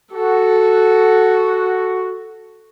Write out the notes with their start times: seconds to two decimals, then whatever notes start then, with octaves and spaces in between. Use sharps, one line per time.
0.13 F#4 A4